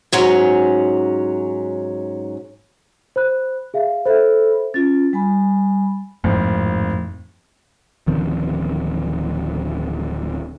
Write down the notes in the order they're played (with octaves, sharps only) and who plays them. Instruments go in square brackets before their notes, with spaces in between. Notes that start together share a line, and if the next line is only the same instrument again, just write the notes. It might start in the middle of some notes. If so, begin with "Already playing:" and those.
[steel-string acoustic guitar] G#2 F#3 C#4
[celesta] C5 B5 F#6
G#4 E5 F5
[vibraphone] A4 B5 [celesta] C5 E5
[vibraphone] C#4 F4 [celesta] A6
[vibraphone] G3 G#5 B5
[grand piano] G#1 F3 [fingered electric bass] F2 A2
[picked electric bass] D1 D#3 F3 C4